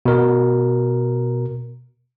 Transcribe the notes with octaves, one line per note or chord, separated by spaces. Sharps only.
B2 A#4